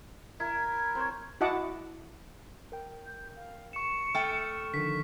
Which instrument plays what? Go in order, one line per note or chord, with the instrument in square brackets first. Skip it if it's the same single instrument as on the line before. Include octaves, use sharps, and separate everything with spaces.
[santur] E4 [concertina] A#4
[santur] C4 C5 C#5
[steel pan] E4 F#4 D#5 F#5 A5 D6
[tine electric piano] A#4 G5
[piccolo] G6
F5
[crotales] C#6 E7 [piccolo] C#7
[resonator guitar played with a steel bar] A3 G5 [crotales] F6
[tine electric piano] D3 D#3 F3 [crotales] B6